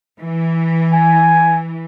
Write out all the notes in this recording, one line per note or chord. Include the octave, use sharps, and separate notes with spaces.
E3
G#5